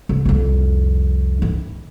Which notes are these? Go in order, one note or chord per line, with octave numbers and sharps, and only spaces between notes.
C2
C2 F2
D#3 E4